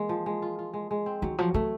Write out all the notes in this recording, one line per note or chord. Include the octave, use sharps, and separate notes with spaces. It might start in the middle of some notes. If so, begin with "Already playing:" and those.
Already playing: E3 G#3 A#3
F3
G#3
F4
F4
G#3
G#3
C4
D#3 F#3
F3 F#3
E3 A3